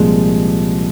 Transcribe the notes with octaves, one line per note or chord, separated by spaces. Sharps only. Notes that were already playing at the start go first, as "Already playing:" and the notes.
Already playing: C2 A#2 F3 G#3